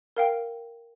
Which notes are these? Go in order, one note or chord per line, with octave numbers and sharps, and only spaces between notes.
A#4 F5 G5